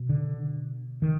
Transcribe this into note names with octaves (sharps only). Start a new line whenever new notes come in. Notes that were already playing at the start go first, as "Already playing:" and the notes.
Already playing: B2
D3
D#3